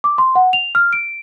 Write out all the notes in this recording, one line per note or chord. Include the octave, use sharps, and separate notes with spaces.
D6
C6
F#5
F7
F6
D7